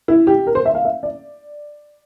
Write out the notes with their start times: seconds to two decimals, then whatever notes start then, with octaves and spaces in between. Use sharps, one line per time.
0.08 E4
0.27 G4
0.47 A#4
0.55 C5
0.65 E5
0.75 F5
0.85 E5
1.03 D5